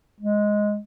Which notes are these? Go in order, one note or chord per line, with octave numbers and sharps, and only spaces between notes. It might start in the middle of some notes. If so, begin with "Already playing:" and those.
G#3